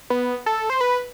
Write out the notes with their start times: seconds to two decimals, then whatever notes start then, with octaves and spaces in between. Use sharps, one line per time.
0.10 B3
0.46 A4
0.70 C5
0.81 B4